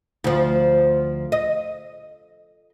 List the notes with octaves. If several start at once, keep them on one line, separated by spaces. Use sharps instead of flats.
D2 F3
D#5